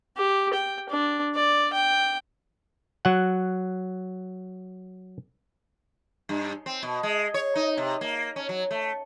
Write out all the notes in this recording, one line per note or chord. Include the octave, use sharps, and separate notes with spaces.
G4
G5
D4
D5
G5
F#3 F#5
G2
C4
B2
G#3
C#5
D#4
C3
A#3
C#4
F#3
A3